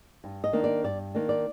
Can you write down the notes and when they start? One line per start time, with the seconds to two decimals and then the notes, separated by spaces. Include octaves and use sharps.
0.24 G2
0.44 D#5
0.53 D#3 A#3 D4
0.64 D5
0.84 G2 D5
1.15 D#3 A#3 D4
1.29 D5